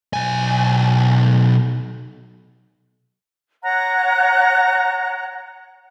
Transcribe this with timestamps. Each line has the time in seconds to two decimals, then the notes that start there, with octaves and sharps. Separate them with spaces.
0.13 B1 G#5
3.63 C#5 F#5 A#5 F#6